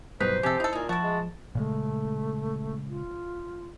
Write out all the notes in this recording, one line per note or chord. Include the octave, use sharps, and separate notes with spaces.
G2 B2 F#3 D#4 B4 C5
F2 C3 G#3 G4 A4 E5
D#4 E4 A4 D#5
A#2 D#4 G#4
F3 E4 F#4 A5
G#3
A#2 C#3 G#3 A3
F4